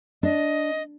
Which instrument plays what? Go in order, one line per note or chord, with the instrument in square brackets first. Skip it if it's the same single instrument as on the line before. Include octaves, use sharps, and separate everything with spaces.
[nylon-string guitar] D4 [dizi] D#5